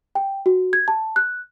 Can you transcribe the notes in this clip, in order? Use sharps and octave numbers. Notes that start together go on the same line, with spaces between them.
G5
F#4
G#6
A5
F#6